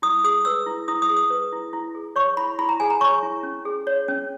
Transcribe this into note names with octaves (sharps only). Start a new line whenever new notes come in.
E4 D#6
G#4 D#6
B4 E6
E4
E4 D#6
D#6
G#4
D#6
B4
E4
E4
G#4
C#5 C#6
E4 B5
E4 B5
A#5
G#4 G#5
A#5
C#5 C#6
E4
C#4
G#4
C#5
C#4